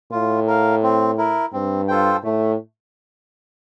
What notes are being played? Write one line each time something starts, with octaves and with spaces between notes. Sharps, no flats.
A2 F4
A#4 F5
C4
E4 A#4
G2 C4
F4 A4 C5 G5
A2 A3